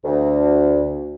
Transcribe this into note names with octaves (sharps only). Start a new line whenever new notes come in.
D2